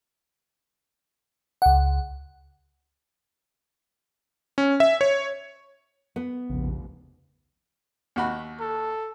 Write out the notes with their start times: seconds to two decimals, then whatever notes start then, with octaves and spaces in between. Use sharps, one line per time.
1.62 C#2 F#5
4.58 C#4
4.80 E5
5.01 C#5
6.16 B3
6.50 F1 A#1 D#2 C#3
8.16 D#2 F#4 B5
8.60 A4